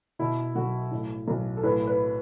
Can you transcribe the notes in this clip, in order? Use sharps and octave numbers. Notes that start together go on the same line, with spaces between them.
B2 E4
B1 F#4
A2
B1
A4
A2 B4
B4